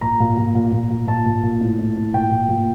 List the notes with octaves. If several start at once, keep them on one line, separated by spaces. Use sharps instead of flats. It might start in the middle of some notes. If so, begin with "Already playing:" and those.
A#2 A#5
A#2
A#2
A#2
A#2
A#2
A#2 A5
A#2
A#2
A2
A2
A2
A#2 G5
A#2
A#2